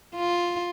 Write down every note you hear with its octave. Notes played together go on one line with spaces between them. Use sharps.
F4